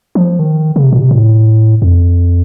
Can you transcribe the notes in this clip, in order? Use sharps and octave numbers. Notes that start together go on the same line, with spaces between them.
F3
D#3
C#3
C3
A#2
C3
A2
F2